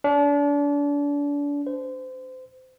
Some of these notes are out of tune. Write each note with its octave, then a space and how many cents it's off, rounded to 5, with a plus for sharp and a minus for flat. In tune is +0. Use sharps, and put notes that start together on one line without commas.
D4 -35
C5 -30